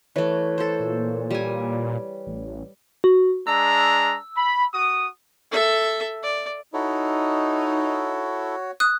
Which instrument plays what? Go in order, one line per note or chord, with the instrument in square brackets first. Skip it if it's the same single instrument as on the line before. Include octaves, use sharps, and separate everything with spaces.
[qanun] E3 A3 [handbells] B4 C#5
[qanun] A4 C5
[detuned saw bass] A#2
[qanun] G3 G#5
[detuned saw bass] A1
[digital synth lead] F#4
[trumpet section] G#3 D4 A#5 [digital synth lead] E6
[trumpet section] B5
F#4 D#6
[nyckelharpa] A4 E5
D5
[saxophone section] D#4 [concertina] E4 A4 [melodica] F#4 C#5
[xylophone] D#6 F#6